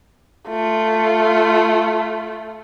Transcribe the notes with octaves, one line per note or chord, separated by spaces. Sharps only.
A3 F4